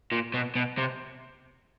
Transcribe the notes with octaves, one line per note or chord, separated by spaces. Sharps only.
A#2
B2
B2
C3